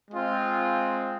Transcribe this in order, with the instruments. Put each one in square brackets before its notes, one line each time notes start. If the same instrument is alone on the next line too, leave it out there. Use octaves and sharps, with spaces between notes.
[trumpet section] G#3 C4 F4